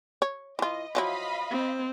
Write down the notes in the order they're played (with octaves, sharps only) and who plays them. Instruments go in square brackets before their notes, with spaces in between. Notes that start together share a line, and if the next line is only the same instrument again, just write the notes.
[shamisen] C#5
[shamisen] E3 F4 [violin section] D#5
[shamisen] F3 F#3 E4 [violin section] D#5 F5 B5
[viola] C4